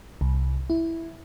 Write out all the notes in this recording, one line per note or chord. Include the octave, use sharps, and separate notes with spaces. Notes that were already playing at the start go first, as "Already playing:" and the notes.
C2
E4